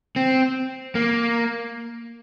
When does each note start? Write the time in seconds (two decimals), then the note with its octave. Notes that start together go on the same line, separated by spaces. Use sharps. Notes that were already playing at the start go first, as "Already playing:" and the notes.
0.16 C4
0.95 A#3